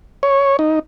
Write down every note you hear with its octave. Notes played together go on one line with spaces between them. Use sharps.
C#5
D#4